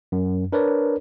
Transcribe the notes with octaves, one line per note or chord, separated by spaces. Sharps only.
F#2
D4 A#4 B4 C#5 D5